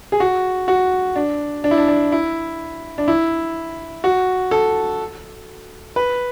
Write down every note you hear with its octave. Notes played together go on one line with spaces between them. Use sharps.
G#4
F#4
F#4
D4
D4
E4
D4
D4
E4
D4
E4
F#4
A4
B4